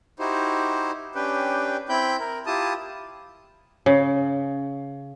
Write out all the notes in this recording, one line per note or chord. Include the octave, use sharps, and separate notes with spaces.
D#4 E4 F#4 G4 C5
C#4 D4 G4 B4 G5
C4 E4 G5 B5 G6
A#4
E4 F4 G4 A5 D#6
C#3